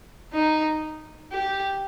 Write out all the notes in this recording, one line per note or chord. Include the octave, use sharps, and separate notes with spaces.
D#4
G4